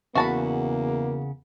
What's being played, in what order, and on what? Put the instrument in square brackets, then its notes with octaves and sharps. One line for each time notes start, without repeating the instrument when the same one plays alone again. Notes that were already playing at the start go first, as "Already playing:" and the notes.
[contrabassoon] E2 [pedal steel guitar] C#3 F#5 C#6 [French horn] A#3 [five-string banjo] F#4 A5 B5